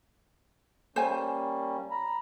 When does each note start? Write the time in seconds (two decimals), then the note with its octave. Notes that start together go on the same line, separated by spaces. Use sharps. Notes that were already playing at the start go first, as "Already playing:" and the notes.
0.96 G3 A#3 C#4 C5 G#5
1.91 A#5 B5